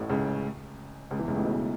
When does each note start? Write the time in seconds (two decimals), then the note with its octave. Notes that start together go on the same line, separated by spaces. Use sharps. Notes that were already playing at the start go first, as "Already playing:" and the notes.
Already playing: A1 A2
0.09 C#2 C#3
1.11 C#2 C#3
1.19 E2 E3
1.28 C#2 C#3
1.36 A1 A2
1.44 B1 B2